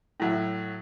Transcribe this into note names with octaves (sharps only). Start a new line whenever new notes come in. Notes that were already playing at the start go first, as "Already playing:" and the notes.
A2 F#3 E5